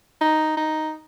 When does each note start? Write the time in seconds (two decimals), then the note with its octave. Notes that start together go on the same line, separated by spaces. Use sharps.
0.21 D#4
0.57 D#4